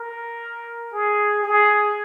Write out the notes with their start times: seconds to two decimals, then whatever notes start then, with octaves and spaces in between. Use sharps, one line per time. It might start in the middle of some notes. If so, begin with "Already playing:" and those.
Already playing: A#4
0.93 G#4
1.43 G#4